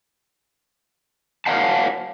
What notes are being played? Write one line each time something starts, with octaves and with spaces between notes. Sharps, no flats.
A#4 C5 C#5 F5 F#5 A5